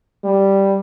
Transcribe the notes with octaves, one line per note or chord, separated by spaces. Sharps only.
G3